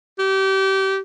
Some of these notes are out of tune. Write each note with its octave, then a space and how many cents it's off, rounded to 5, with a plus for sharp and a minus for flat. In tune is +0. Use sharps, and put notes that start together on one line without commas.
G4 -30